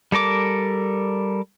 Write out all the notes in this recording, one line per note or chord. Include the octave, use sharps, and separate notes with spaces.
G3 A4 A#4 D6